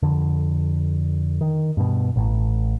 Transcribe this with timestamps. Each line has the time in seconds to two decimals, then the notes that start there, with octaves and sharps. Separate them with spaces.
0.02 F2 D3
1.41 D#3
1.77 G2 B2
2.16 A1 A2